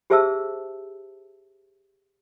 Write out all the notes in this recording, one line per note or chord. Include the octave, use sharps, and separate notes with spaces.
G4 G#4 C5 E5 A5 E6